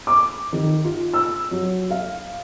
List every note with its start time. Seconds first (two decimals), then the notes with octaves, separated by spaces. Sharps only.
0.07 D6
0.53 D#3
0.84 F4
1.14 E6
1.51 F#3
1.90 F5